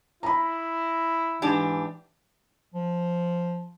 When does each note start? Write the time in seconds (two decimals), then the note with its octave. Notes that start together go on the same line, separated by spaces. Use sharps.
0.23 E4 A#5 B5
1.42 G#2 E3 D4 G4
2.74 F3